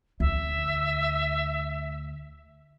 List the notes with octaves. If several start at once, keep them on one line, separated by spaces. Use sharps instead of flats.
D2 E5